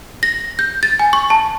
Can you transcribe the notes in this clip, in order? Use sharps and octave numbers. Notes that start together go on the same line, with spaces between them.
A#6
G6
A6
G#5
C#6
A5